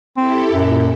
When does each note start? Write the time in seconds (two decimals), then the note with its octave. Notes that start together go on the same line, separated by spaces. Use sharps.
0.17 C4 E4 G4 A4
0.52 F#2 A#2